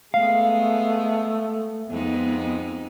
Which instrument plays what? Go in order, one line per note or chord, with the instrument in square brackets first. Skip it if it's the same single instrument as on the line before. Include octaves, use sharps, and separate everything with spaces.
[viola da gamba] G#3 B3 [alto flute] A3 [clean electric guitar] F5
[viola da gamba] F2 G#3 D#4 [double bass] B3